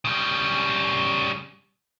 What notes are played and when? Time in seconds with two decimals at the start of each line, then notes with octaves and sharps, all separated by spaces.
0.05 C#3 G3